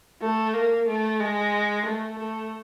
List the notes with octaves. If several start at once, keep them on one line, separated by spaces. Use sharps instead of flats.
A3
A#3
A3
G#3
A3
A3